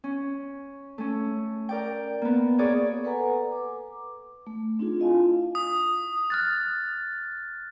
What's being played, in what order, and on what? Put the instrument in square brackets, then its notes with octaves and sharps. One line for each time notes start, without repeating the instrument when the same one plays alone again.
[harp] C#4
A3 C#4
A#4 D5 G5
A#3 B3
F#4 G#4 A#4 C#5 D5
[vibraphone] A4 B4 F#5 G#5 A#5
D6
A3
C4 D4 D#4 F4 G#4
E4 F4 D#5 F5 G#5 A5
[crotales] D#6
[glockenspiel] F6 F#6 A6